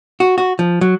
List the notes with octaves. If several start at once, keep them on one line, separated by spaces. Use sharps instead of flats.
F#4
F#4
F3
F#3